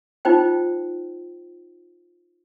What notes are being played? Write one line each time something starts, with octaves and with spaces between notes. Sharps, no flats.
D#4 F4 C5 G5